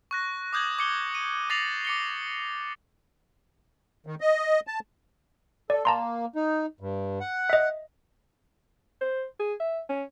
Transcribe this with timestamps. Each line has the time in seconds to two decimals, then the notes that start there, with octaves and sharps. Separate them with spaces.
0.11 C#6 F#6 A#6
0.53 D6 D#6 G6 G#6 F#7
0.79 D6 C#7 G7
1.15 D#7
1.50 D6 A6 A#6 C7 F7 F#7
1.85 D6 C#7 G7
4.06 D#3
4.21 D#5
4.67 A5
5.70 A4 D5
5.85 A#3 A5 A#5 C6
6.36 D#4
6.80 G2
7.20 F#5
7.50 D#5 E5
9.01 C5
9.40 G#4
9.60 E5
9.89 C#4